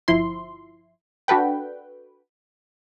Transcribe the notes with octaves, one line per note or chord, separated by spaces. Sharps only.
G1 F3 E4 C6
D4 F#4 A4 B4 G5